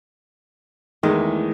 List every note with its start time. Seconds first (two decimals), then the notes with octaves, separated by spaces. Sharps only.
1.03 E2 D#3 E3 G#3 A3